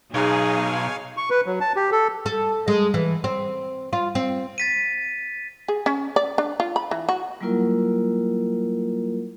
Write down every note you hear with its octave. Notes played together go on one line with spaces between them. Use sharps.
B1 D#4 G#4 C#5 F5 G#5
C#6
B4
F#3
A5
G4
A4
A4
G#3
E3
C4
F4
C4
A6 B6 D#7
G#4
C#4
D5
D4
F4
B5
E3
F#4
F#3 G3 A#3 E4 F4 A#4